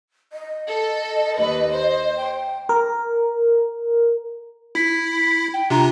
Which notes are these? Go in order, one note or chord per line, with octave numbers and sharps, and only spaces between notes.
D#5
A4
D#2 B4
C5
G5
A#4
E4 B6
G5
C3 D4 F4 A#5